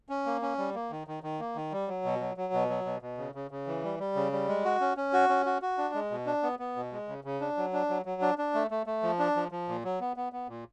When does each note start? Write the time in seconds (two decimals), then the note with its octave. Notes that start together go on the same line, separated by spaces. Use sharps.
0.09 C#4
0.26 A#3
0.42 C#4
0.58 G3
0.74 A#3
0.91 D#3
1.07 D#3
1.23 D#3
1.40 A#3
1.56 D#3
1.72 G3
1.88 F#3
2.05 B2
2.20 F#3
2.37 F#3
2.53 B2
2.70 F#3
2.86 B2
3.02 B2
3.18 C#3
3.35 C#3
3.51 C#3
3.67 E3
3.83 G3
4.00 G3
4.16 C#3
4.32 G3
4.48 G#3
4.64 F#4
4.81 C#4
4.97 C#4
5.13 F#4
5.29 C#4
5.46 F#4
5.62 F#4
5.78 D4
5.94 G#3
6.11 B2
6.26 D4
6.43 B3
6.59 B3
6.76 B2
6.92 G#3
7.08 C#3
7.24 C#3
7.41 D4
7.57 F#3
7.73 D4
7.89 F#3
8.06 F#3
8.22 D4
8.38 D4
8.54 A3
8.71 A3
8.86 A3
9.03 F3
9.19 D4
9.36 F3
9.52 F3
9.68 A#2
9.84 F#3
10.01 B3
10.17 B3
10.33 B3
10.49 A#2